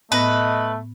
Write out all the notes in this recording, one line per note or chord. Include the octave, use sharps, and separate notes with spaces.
A2 A3 B3 B4 D#5 A#6